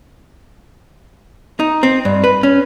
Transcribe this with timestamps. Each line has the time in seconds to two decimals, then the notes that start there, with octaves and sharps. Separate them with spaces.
1.60 D#4
1.83 C4
2.05 G2
2.24 B4
2.43 C#4